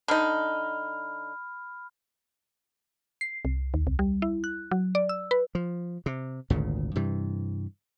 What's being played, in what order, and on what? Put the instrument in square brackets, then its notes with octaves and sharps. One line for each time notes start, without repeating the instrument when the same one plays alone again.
[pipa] D3 D#4 [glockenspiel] B5 F6
[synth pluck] C7
C2
D#2
C2
G3
E4
F#6
F#3
D5
E6
B4
[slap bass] F3
C3
G#1 D2 A#2 C#3
G2 C3 E3